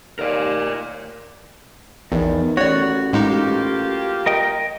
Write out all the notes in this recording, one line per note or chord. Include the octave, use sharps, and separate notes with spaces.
D#2 A#4 D5
A#1 E2 D#3
A1 F#4 C#5 D5
A2 G#3 A#3 D#4 F4 G4
A#4 D#5 G5